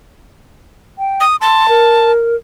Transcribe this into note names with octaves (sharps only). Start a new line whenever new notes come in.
G5
D#6
A5 C6
A#4